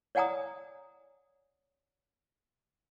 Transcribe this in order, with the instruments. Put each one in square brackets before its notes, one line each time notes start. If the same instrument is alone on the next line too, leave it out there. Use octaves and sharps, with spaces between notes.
[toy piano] C#5 D5 F#5 G#5 A#5 D#6